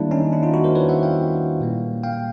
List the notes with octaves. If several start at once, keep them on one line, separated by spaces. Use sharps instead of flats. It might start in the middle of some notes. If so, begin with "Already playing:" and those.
Already playing: D#3 G3 A#3 D4 E4
C#4 D#4
D4 E4
D#4 F4
E4 F#4
A#4 C5
B4 C#5
E5 F#5
F5 G5
A#2 G3 A#3
F5 G5